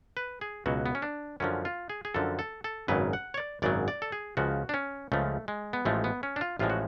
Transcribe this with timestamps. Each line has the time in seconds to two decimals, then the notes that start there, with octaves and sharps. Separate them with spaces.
0.17 B4
0.41 G#4
0.66 C#2 B2 F#3 F#4
0.86 B3
0.95 C#4
1.02 D4
1.40 F#2 D3 F3 C#4
1.65 F4
1.90 G#4
2.05 G#4
2.14 F#2 D3 F3 A4
2.39 A4
2.64 A4
2.88 G#1 F#2 C#3 F#3 B4
3.13 F#5
3.34 C#5
3.38 D5
3.62 G#1 F#2 C#3 F#3 D5
3.88 D5
4.02 A4
4.12 G#4
4.37 C#2 C#3 F3 F#4
4.69 D4
4.74 C#4
5.12 C#2 C#3 F3 A3
5.48 G#3
5.73 B3
5.85 A1 A2 F3 G#3 A3
6.04 B3
6.23 C#4
6.36 D4
6.41 F4
6.59 A1 A2 F3 G#3 F4
6.70 F#4